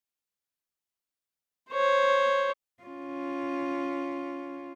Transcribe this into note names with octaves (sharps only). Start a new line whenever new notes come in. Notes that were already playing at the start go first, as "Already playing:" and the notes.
C5 C#5
C#4 F4